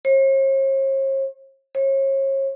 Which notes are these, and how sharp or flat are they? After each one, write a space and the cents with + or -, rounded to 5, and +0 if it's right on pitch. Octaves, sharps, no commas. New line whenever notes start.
C#5 -45
C#5 -35